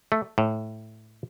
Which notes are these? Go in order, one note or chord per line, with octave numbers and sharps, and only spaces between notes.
A3
A2